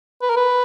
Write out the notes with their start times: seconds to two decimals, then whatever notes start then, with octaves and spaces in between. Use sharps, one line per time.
0.22 B4
0.30 A#4
0.36 B4